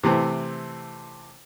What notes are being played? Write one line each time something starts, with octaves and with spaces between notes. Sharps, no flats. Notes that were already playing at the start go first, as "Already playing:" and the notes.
C3 E3 A3 C4